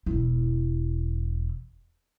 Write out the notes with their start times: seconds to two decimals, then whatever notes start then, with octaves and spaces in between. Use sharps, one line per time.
0.06 E1 E4